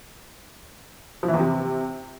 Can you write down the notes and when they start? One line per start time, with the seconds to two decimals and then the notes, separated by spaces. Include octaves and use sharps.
1.23 F3
1.28 E3
1.34 E2
1.39 C3